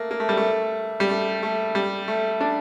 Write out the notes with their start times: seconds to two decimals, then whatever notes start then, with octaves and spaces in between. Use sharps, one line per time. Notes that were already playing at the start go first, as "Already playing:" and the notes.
Already playing: A3 A#3
0.11 A#3
0.20 A3
0.29 G3
0.37 A3
1.00 G3
1.09 A3
1.43 A3
1.75 G3
2.08 A3
2.41 D4